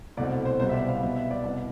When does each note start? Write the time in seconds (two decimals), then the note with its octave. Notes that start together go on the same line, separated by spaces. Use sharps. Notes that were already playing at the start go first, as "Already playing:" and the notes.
0.17 C2 B2 A3 C4 D5
0.45 C5
0.60 C2 B2 G3 B3 C5
0.69 E5
0.74 D5
0.88 F5
1.02 B2 G3 B3 E5
1.16 E5
1.31 D5
1.44 C2 B2 B3 D5